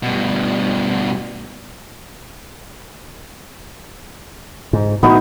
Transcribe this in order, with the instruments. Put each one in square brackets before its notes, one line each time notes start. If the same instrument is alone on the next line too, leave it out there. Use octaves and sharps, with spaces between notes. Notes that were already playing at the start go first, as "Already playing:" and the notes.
[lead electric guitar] G2 B2
[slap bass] G#2
[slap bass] A2 E3 [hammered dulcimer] B3 D#4 F#4